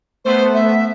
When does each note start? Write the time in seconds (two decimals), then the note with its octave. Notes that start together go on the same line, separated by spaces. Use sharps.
0.25 A3 B3 C5
0.54 E5